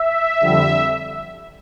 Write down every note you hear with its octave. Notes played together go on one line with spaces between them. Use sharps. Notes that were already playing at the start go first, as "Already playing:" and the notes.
Already playing: E5
F2 D3 G3